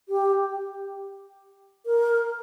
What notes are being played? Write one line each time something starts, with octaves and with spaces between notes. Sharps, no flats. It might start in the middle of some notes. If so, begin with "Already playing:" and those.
G4
A#4